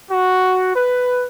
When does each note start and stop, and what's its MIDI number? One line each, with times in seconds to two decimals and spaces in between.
0.10 0.72 66
0.74 1.27 71